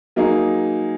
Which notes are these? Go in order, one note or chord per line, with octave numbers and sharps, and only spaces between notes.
F#3 A#3 D#4 G#4